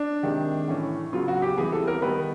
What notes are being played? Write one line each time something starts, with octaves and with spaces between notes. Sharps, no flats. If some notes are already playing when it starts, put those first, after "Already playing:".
Already playing: D4
C3 D#3 G#3
A2 E3 A3 C#4
C#3 F#3 B3 F4
F#4
G4
C3 E3 G3 B3 G#4
A4
A#4
D#3 G3 B3 B4